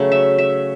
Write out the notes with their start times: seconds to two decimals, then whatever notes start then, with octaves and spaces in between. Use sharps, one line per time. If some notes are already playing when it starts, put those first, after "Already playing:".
Already playing: C#3 F#3 A3
0.12 E5
0.38 E5